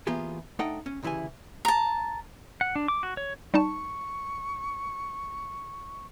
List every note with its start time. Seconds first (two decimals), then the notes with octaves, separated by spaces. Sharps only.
0.07 E3 A#3 B3 F4 G4 G#4
0.59 A3 D4 D#4 A4 F#5 G5
0.86 C#4
1.03 D2 C#3 E3 E4 G4 G#5
1.65 A5 A#5
2.61 F#5
2.76 D4
2.88 D6
3.03 F#4
3.17 C#5
3.54 G3 D#4 A5 C#6